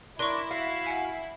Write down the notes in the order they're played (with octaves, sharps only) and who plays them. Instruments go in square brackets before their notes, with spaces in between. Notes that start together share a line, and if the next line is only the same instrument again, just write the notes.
[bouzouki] D4 A#4 D5 [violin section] E4 [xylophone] C6 C#6
[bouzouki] F#4 [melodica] F5
[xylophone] E5 F#5 G#5